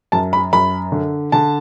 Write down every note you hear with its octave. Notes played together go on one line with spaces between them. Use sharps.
F#2 A5
B5
F#2 B5
D3
D3 A5